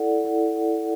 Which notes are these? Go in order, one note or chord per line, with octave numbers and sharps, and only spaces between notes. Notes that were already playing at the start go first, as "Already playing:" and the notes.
Already playing: E4 A4 D5 F#5
E4 A4 D5 F#5